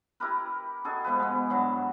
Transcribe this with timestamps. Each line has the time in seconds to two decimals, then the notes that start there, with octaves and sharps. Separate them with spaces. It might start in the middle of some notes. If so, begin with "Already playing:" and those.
0.20 E4 G4 A#4 B4
0.84 F#4 G#4 A4 D#5
1.04 G#2 B2 F3 B4
1.19 G#3 B3
1.50 G2 F#3 E4 A5